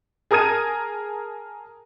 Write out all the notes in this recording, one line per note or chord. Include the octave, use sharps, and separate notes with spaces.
G#4 A#4 A5 D#6 G#6 D#7